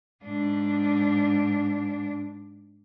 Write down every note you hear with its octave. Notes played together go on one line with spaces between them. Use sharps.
G#2 D4